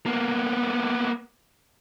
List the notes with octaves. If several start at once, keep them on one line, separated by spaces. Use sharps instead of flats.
A#3 B3